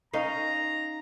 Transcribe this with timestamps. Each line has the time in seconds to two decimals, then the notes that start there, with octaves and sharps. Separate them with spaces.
0.13 C#4 D#4 F5 A#5